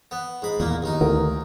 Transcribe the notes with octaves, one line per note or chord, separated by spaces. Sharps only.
B3
G#2 B5
E2 A#2 A#3
D#2 D#4
D2 A#4